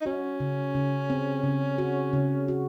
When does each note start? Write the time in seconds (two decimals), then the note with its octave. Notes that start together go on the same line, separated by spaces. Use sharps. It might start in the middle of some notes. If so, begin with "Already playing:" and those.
0.01 D#4
0.06 C#4 F#4
0.40 C#3
0.75 C#3
1.10 C4
1.44 C#3
1.78 F#4
2.13 C#3
2.48 F#4